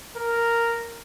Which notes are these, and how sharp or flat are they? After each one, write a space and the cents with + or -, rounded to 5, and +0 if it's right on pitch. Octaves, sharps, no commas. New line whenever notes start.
A#4 -5